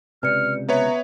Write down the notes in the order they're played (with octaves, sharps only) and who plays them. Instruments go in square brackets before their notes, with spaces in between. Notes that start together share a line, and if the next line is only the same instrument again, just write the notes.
[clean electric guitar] C#2 G2 C3 [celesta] B4 D5 C#7 [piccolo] F6
[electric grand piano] B3 B4 C#5 [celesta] E5 [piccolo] A#5